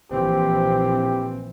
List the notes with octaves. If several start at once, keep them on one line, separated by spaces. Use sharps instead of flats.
A#1 E3 C4 G4